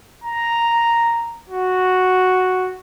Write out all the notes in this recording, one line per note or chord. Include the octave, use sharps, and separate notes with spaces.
A#5
F#4